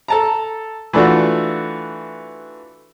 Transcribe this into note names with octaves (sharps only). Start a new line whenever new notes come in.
A4 A5 A#5
E3 A3 D4 F4 F#4